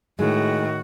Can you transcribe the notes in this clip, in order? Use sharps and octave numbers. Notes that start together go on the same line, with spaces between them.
A2 D#3 G#3 F#4